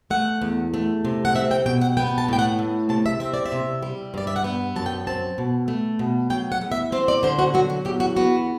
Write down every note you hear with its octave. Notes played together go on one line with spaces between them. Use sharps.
A3 F#5
E2
A3
C3
F#5
C4 E5
G5
B2 G5
F#5
B3 G5
A5
A2 G5
F#5
A3
C3 A5
E5
C4 E5
D5
E5
C3
G3
G2 D5
E5
F#5
B3 G5
F#2 A5
G5
C4 A5
B2
A3
B2
F#3 G5
F#5
E2
E5
C4 C5
D5
D3 C5
F#4
F#3 F#4
F#4
E2 G4
F#4
B3 F#4